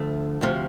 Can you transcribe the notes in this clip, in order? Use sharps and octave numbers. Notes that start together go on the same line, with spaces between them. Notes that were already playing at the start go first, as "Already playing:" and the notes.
Already playing: D2 D3 F3 A3
D2 C3 F3